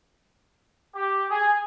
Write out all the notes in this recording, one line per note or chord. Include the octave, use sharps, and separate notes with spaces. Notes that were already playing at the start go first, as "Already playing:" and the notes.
G4
G#4